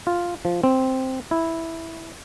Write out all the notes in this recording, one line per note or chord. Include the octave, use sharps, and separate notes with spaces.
F4
F3
C4
E4